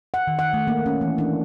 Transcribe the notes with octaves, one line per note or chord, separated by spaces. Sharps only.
F#5
D#3
F#5
A3
A#3
C#4
E3
D4